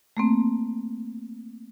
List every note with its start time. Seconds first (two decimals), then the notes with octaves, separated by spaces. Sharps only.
0.17 A3 A#3 C4